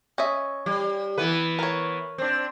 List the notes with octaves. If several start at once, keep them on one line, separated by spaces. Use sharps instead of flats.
C#4 D#5 E5
G3
E3 B3 B4
A#4 C#5
C4 D4